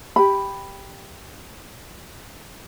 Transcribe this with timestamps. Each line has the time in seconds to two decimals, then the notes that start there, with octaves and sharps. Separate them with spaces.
0.16 G4 B5